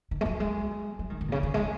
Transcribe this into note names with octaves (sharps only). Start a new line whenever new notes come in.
D#3
G#3
F#3
G#3
F#3
D#3
D#3
A#2
C#3
D#3
G#3